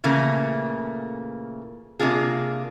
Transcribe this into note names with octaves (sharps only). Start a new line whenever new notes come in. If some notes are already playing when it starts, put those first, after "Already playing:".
A#2 C#3 E3 A3 A#3
C3 A#3 D4 F4 G#4